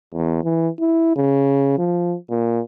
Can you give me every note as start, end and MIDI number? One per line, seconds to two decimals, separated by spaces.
0.15 0.39 40
0.44 0.69 52
0.80 1.13 64
1.16 1.74 49
1.78 2.16 53
2.30 2.60 46